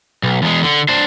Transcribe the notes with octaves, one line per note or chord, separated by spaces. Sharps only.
B1
E2 G#3
D3
D4 C5